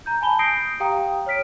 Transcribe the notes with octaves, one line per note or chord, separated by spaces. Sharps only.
A#5 G6
G#5 A5 B5 G7
D#6 G6 A#6 C7 D7
G4 F5 G5 A#5 D#6
C#5 F6 B6 D7